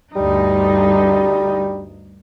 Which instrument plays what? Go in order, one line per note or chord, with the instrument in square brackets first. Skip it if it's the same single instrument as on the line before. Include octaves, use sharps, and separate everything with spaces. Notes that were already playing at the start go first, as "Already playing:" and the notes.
[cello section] D2 G2 D#4 [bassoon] G3